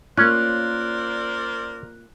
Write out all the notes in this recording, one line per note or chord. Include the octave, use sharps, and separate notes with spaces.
A#3 C#4 F4 A#4 C5 D5 F#6